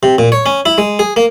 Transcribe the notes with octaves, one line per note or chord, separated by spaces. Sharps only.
C3
A#2
C#5
C#4
E4
G#3
G#4
A#3